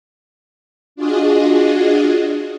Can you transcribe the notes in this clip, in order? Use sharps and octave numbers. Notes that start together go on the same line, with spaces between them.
D4 F4 F#4 G#4 D#5